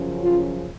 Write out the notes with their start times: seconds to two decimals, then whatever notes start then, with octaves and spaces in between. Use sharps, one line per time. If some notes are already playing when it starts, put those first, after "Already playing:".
Already playing: F#2 C#3 F3
0.23 F4